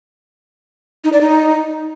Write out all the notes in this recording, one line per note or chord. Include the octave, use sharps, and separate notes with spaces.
D#4
D5
D#4